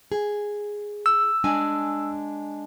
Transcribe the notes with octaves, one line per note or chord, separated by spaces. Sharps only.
G#4
E6
G#3 D4 G#5